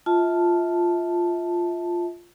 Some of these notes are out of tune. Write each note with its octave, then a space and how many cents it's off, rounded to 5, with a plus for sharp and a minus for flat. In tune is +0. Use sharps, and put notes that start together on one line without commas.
F4 -5 E5 -30 A5 +0